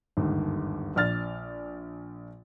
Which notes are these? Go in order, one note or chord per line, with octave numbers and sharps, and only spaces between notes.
G1 D#2 G#2
A#1 D5 F6 A6